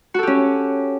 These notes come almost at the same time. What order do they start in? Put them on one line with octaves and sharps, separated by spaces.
F#4 A4 G4 C#4